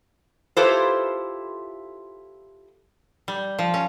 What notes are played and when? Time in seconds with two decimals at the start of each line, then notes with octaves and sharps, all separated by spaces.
0.57 E4 F4 G4 A4 B4 C5
3.28 G3
3.59 F3
3.74 C#4